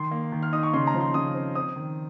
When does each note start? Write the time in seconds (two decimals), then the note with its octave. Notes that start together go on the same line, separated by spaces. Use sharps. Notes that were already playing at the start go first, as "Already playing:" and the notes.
Already playing: D#3 C6
0.11 A#3
0.32 D#3
0.43 F6
0.53 D#4 D#6
0.63 C#6
0.73 C#3 C6
0.87 A#5
0.94 F3
1.01 C6
1.14 C#3 D#6
1.35 C4
1.55 C4 D#6
1.76 D#3